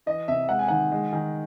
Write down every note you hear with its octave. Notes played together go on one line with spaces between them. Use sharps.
E3 D#5
C3 E5
G#3 F#5
G#5
D#3 F#5
G#3
D#3